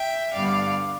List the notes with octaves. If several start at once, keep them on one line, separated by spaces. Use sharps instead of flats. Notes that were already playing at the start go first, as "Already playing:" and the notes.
Already playing: E5 G5
G2 D3 G3 B3 D5 F5